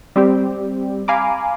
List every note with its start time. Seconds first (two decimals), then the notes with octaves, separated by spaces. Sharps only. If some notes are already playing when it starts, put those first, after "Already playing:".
0.16 G3 C4 G4
1.08 F5 G#5 A#5 B5 D6